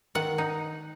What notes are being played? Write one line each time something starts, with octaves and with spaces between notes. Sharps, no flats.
D#3 F#5
D#4